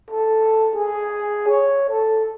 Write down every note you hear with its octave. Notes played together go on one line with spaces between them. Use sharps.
A4
G#4
C#5
A4